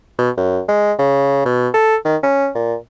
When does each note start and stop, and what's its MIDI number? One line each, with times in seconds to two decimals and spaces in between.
0.19 0.30 47
0.37 0.61 42
0.68 0.93 56
0.99 1.45 49
1.46 1.69 47
1.74 1.97 69
2.05 2.17 51
2.23 2.49 61
2.55 2.76 46